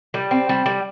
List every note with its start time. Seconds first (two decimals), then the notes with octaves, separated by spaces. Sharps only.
0.14 G3
0.31 C4
0.49 G3
0.66 G3